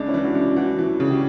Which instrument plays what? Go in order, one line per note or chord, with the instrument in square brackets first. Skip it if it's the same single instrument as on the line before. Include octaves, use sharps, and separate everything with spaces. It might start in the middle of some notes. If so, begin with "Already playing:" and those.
Already playing: [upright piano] C#2 [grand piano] D4
[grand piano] C#4 E4
[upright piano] E3
[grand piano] D4 F#4
[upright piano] C#2
[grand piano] D4
[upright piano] E3 [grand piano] D4 F#4
[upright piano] E3
C#3
[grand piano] G4